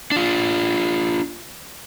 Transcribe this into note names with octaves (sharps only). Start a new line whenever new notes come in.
D4 F4